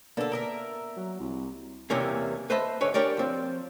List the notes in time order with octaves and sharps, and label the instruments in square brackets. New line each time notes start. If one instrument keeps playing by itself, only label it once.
[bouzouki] D3 A4 [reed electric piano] A#3 B3 D4
[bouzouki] A#4 D#5 E5
[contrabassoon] F#3
C2
[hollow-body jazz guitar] E2 C3 E3 G3 A#3 C#4
B4 C5 D#5 E5 A5 B5
G#2 D3 C#4 B4 C#5
D4 G4 A#4 C#5 D5
F3 C4